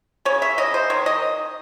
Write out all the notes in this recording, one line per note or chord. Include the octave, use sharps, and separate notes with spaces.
C#3 C#5
E5
C#3 D#5
C5
D#3 C#5
D#5